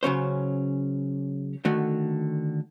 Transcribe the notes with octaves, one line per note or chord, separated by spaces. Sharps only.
C#3 F#3 C#4 C5
D3 D#3 A3 F#4